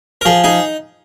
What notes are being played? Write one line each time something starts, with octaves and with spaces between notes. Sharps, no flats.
A#4
F3 G#4
D#4 G#4